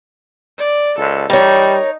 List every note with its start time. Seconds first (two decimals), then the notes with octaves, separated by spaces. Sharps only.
0.58 D5
0.98 C#2 A4
1.30 G3 D#4 A#4 C#5